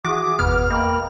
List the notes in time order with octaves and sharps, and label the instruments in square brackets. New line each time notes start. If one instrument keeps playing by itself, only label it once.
[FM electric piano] E3 [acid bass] F#4 [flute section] G#4 E5 D#6 [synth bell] D6
[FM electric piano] G1 E2 B2 [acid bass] B3 [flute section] F#5 [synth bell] F6
[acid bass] A#3 [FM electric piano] D#5 [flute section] G5 A#5 B5